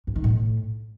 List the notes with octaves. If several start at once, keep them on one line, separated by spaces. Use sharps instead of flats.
G2
D#3
A2